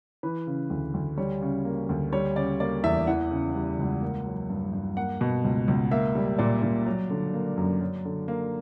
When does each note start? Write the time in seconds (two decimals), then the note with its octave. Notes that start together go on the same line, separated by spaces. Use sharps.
0.23 E3 B4
0.47 C#3
0.70 D2
0.94 D2
1.17 G3 C#5
1.42 C#3
1.65 A#3
1.89 D2
2.12 G3 C#5
2.36 C#3 D5
2.60 A#3 D5
2.83 E2 E5
3.07 E3 F#5
3.31 C#3
3.55 G3
3.78 C#2
4.02 A#3
4.26 F#3
4.50 G2
4.73 G2
4.97 A#3 F#5
5.21 B2
5.44 C#2
5.68 C#2
5.91 A#3 E5
6.15 G3
6.38 A#2 D5
6.63 A#2
6.86 F#3
7.10 D3
7.34 A#3
7.57 F#2
7.81 F#3
8.05 D3
8.28 A#3